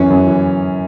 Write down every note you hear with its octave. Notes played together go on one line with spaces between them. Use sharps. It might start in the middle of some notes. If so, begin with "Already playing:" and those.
Already playing: F#2 E3 C#4
F#2
E3